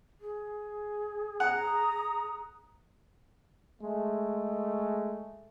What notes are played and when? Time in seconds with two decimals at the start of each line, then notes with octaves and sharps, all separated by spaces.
0.21 G#4
1.40 F#5 A#5 D#6
3.81 G#3 A3